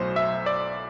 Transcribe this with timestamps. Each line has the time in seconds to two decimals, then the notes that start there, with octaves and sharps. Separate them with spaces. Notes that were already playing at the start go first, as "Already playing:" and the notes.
Already playing: B1 A2 F#3 C5
0.16 E5
0.46 D5